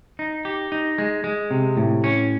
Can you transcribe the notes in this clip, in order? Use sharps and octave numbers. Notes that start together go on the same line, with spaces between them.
D#4
G4
D#4
G#3
G#3
C3
A2
C#4